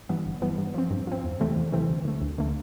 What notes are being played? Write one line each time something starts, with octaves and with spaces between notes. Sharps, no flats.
G2 E3 B3
G1
G2 E3 B3
G2
F3 C4
G2
F3 C4
E2
C3 E3 A3 C4
E2
C3 E3 A3 C4
D2
D3 A3
D2
D3 A3